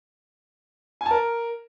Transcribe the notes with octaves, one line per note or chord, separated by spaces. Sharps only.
G#5
A5
A#4